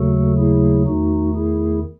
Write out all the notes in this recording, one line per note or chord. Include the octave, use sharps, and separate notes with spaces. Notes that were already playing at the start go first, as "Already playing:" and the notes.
Already playing: D#2 C#3 F#3 A3 F#4 A4
E4 G#4
E2 D#3 A3 D#4 F#4
E4 G#4